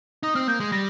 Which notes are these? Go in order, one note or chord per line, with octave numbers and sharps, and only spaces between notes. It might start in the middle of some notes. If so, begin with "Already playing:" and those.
D#4 D#6
C4 F6
A#3 G6
G#3
G3 A#6